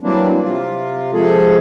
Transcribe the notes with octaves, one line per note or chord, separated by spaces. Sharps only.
E3 F#3 G3 A#3 C4 D4
C3 F4
C3 F3 G#3 G#4 A4